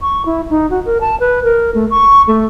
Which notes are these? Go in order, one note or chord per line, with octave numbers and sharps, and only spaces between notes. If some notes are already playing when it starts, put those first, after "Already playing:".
C#6
E4
D#4
F#4
A#4
A5
B4
A#4
A3
C#6
A3